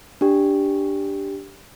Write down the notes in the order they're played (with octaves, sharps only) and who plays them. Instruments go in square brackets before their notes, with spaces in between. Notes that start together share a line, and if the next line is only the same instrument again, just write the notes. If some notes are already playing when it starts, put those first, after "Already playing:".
[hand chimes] D4 G4